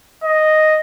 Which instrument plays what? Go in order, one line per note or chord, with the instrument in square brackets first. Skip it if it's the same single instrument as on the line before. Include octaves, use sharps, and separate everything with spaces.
[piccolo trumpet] D#5